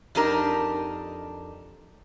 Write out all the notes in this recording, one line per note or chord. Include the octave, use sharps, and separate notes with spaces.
F2 D4 D#4 G4 A#4